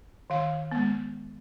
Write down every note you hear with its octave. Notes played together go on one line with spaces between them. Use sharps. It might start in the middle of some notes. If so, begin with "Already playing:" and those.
D#3 F5
G#3 B3